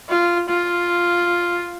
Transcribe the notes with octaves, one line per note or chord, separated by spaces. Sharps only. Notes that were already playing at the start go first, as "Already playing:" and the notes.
F4
F4